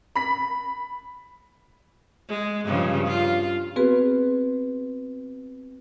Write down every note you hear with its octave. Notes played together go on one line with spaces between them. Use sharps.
B5 B6
G#3
G2 C#3 F3
F4
B3 C4 F#4 G#4 B4